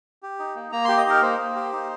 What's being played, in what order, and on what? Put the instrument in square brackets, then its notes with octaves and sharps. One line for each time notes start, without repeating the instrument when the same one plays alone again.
[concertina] G4
D#4
A#3
A#3 A#5
G4 C6
D#5
D#4 A#4
A#3 C5
A#3
G4
D#4